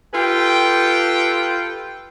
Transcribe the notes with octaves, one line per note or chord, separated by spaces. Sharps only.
F4 G4 A4 B4 G5